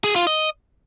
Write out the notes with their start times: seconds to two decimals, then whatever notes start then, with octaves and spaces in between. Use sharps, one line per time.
0.04 G#4
0.16 F4
0.27 D#5